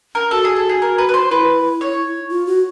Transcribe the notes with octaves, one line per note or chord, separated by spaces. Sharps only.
A#4
F#4 A4
G#4
A4
G#4
A#4
B4
B4
C5
E4 B4
C#5
F4
F#4